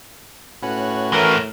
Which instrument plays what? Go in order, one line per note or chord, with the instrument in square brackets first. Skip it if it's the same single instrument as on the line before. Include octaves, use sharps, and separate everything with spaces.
[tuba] A2 [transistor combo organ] C#4 F#4 B4
[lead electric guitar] E3 A3 [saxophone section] A#4